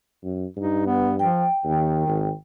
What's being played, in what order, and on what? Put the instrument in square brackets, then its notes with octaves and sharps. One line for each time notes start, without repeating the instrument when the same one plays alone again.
[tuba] F#2
[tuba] G2 [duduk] D#4
[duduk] B3
[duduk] F3 [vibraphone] G5
[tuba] D#2 [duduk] D#3
[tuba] G#1